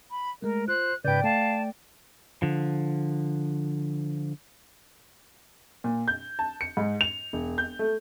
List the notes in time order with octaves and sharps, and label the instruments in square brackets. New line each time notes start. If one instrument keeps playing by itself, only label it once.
[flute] B5
[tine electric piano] G#3 A3 [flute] A#4
[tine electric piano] F4 [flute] C5 [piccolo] F#6
[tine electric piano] G#2 C#3 [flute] B4 [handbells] D5 G5 [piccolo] G6
[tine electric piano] A3 [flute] F5 [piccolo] A5
[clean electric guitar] D3 F3
[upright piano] A#2
G6
A5
C#7
G#2
F7
E1
G6
A3